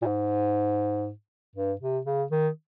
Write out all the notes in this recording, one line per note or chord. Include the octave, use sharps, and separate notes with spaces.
A#2
G#2
G2
C3
C#3
D#3